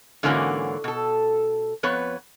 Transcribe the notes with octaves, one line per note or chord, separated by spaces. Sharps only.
G#2 D3 E3 A#3 C#4 F#4
B2 A4
F2 B3 B4 C#5